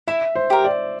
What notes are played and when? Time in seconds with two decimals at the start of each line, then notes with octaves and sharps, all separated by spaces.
0.08 E4 E5
0.35 C5
0.50 G4 A#4
0.64 D5